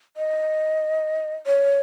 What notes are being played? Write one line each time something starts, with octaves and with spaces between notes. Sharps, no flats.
D#5
C#5